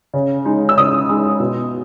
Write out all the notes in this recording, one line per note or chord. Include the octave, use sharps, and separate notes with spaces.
C#3
G#3 D#4
E6
C#3 D#6
G#3 D#4
B2